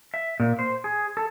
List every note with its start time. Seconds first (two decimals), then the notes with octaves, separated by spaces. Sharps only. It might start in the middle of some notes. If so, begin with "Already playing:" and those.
0.14 E5
0.40 A#2
0.59 C5
0.84 G#4
1.17 A4